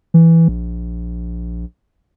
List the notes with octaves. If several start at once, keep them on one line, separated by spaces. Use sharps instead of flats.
E3
A#1